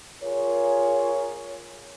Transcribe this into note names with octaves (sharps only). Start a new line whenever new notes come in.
F4 G#4 A#4 C#5